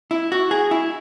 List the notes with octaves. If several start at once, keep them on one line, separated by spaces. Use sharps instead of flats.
E4
F#4
G#4
E4